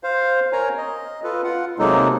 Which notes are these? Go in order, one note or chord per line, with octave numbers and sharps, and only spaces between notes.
C5 F5
A#4 C#5 G#5 A#5
D#5
F4 A4 B4
F4 F#5
C3 F#3 G#3 A#3 D#4 A4